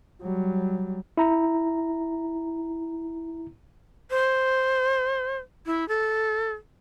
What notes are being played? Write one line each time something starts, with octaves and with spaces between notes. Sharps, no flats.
F#3 G3
E4 A#5
C5
E4
A4